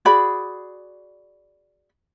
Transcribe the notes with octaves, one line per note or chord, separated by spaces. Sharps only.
F#4 G#4 D5 B5